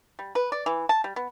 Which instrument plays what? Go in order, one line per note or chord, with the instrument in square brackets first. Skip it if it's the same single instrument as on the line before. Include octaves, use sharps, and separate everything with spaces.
[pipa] G3
B4
D5
E3
A5
G3
B3